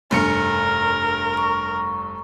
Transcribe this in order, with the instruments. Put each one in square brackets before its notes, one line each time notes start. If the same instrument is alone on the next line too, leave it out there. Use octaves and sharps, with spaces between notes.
[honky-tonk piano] F1 G2 C#7 [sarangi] A#4
[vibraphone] A#5 C#6